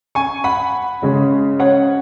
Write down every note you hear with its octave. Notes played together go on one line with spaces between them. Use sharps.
G#5 C#6
F#5 B5
C#3 G#3 C#4
C#5 F#5